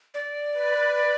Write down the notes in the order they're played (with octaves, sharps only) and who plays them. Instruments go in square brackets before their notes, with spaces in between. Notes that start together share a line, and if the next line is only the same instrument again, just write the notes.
[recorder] D5
[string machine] B4